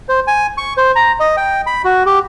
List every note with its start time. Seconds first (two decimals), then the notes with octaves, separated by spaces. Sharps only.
0.09 C5
0.27 G#5
0.58 C#6
0.77 C5
0.96 A#5
1.20 D#5
1.37 G5
1.66 B5
1.84 F#4
2.06 G4